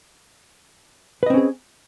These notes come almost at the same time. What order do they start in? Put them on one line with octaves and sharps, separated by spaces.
B4 D#5 C4 C#4 G#4